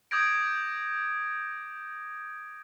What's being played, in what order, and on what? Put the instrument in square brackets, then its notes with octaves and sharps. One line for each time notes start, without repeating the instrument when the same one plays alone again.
[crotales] D6 D#6 G6 G#6 A#6 D7